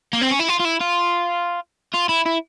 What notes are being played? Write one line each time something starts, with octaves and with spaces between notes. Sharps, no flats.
A#3
C4
C#4
E4
F4
F4
E4
F4
F4
E4
E4